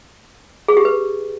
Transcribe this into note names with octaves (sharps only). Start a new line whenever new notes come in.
G#4
G4
B4